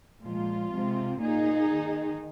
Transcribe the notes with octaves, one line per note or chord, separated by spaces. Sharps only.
A#2 F3 G#3 F4
C3 G#3 C4
A#2 A#3 D#4 G#4
D#3